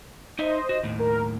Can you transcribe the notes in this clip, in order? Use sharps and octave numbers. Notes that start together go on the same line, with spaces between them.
D#4 C5 D#5 E5
F#4
D#2 A2
A#4